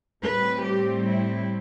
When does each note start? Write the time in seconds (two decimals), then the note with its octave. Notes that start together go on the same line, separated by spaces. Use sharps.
0.24 A2 G3 C4 B4
0.66 G4
1.07 E4